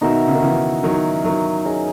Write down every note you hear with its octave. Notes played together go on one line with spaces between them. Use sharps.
B2 D#3 D#4 F#4 A#4 E5
C#3
D#3
C#3 E3
D#3 F#3
D#3 F#3
C#4 G#4 D#5